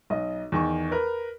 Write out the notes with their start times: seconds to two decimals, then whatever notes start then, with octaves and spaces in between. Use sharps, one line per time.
0.10 B1 D#5
0.52 E2 D#3 C#6
0.91 A#4 B4